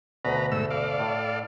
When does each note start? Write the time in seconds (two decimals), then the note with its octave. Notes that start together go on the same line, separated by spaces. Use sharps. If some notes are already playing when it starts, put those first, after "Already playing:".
0.25 D2 B2 B4 A#5
0.52 G#2 A3 E6
0.70 A4 D5 F5
0.99 A2